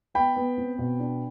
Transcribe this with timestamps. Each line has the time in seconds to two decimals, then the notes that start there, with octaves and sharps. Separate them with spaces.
0.14 B3 G5 B5
0.36 B3
0.57 C4
0.78 B2
1.00 D4